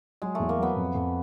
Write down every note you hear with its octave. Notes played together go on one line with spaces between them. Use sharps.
F#3 G#3
E2 A3
A#3
F#3 B3
F2
F2